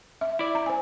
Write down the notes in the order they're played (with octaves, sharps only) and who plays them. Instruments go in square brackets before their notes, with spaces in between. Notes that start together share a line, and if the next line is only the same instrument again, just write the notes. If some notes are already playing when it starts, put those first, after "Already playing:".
[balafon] E5
[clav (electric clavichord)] E4 D5
[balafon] A#5
C5 G#5